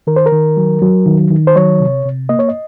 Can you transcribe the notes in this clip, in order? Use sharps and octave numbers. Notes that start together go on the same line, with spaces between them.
D#3 A#4
C5
A#4
D#3
F#3
F#3
D#3
D#3
C5
F#3 C#5
C3
C3
A#3 D#5
C#5
D#5